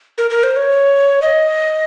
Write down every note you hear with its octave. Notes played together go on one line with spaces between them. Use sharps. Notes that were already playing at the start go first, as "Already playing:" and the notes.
A#4
A#4
C5
C#5
D#5